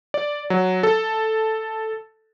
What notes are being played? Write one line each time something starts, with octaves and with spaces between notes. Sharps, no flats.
D5
F#3
A4